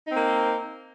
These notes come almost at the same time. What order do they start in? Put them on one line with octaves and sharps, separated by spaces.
D#4 C4 A#3